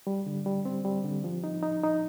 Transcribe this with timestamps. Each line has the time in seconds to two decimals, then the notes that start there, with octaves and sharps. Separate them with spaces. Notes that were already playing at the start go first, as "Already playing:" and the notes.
0.07 G3
0.27 D3
0.46 G3
0.65 C4
0.85 G3
1.04 D3
1.24 F3
1.44 D#4
1.63 D#4
1.83 D#4